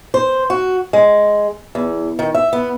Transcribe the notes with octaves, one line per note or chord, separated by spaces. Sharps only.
C5
F#4
G#3
E2
D#3
E5
B3